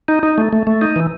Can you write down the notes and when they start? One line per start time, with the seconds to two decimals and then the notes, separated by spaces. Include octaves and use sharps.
0.08 D#4
0.23 D#4
0.38 A3
0.53 A3
0.67 A3
0.81 D#4
0.96 E3